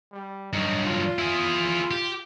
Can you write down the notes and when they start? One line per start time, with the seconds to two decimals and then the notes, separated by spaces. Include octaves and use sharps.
0.12 G3
0.53 G2 F#3 D#4
0.85 F4
1.19 E4 G#4
1.91 G4